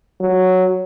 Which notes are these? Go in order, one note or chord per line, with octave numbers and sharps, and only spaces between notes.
F#3